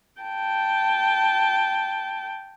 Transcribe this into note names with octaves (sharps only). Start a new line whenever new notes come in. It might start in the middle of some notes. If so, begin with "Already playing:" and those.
G5 A5